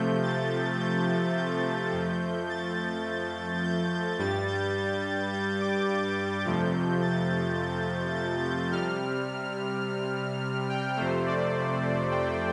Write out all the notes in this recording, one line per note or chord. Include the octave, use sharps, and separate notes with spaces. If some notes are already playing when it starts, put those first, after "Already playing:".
Already playing: C3 F3 A3 G6
A6
G6
G6
F2 F3 A3
A6
G6
G6
G2 G3 A6
G6
G6
D6
G6
F2 C3 F3 A3
A6
A6
G6
C3 G3 F6
G5
F2 C3 A3 C5
D5
G5